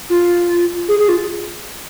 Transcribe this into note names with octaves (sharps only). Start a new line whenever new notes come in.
F4
G#4
G#4
F4